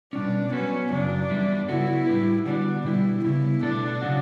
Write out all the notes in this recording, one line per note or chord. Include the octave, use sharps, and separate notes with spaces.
B2 G3 C#4 D4
F#3 B3 C#4 F#4 B4
F#2 C#3 F#3 D4
G2 E3 G3 B3 E4
C#3 F#3 B3 E4 F#4 A4
A2 G3 D4 G4 B4
D3 G3 B3 D4 F#4
B2 G3 D4 E4 G4
C#3 G3 B3 E4
B2 A3 D4 E4 A4
C#3 F#3 C#4 F#4